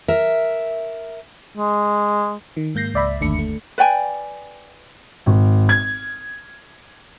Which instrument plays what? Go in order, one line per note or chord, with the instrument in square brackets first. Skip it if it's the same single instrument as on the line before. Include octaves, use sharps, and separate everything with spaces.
[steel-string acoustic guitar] A#4 E5
[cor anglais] G#3
[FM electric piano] D#3
G#2 A#3 G6 A#6 C7
C#2 D5 E5 B5
G1 D#2 D3 A3 D4 C#7
A3
[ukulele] B4 D5 G5 G#5
[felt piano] G#1
G#6